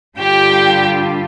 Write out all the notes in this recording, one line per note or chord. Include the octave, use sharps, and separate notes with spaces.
G2 D3 G3 D4 F4 G4 G5